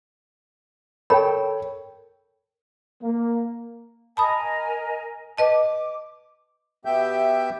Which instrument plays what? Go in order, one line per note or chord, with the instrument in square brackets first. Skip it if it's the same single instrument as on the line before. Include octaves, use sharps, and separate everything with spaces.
[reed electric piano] A4 G5 [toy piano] A#4 B5 [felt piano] C#5
[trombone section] A#3
[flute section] A#4 D#5 G#5 [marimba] A5 B5 D#6
[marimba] B4 D#5 A5 [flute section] D6
[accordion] B2 B3 G4 E5 G5 G6